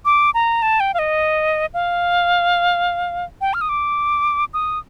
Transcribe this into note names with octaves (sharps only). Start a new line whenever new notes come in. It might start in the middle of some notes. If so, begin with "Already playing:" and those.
D6
A#5
A5
G5
F5
D#5
F5
G5
F6
D#6
D6
D#6